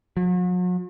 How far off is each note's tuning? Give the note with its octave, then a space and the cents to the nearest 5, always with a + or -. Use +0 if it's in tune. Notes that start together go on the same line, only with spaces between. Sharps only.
F#3 -45